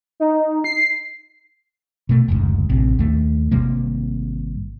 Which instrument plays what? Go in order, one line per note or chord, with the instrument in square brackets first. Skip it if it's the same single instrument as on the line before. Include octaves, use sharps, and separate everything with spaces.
[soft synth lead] D#4
C7
[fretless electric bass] B2 A3
F#1 D2 G#2
A1 C3
D#2 A3
G#1 C3 G3 A#3